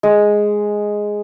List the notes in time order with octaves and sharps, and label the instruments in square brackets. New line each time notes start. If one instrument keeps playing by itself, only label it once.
[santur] G#3